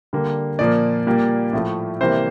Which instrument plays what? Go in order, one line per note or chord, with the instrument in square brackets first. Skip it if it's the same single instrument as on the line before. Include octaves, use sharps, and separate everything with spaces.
[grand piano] D3 G3 A#3
A#2 F3 A#3 D5
A#2 G3 A#3
A2 F3 A3
C3 E3 G3 A#3 C5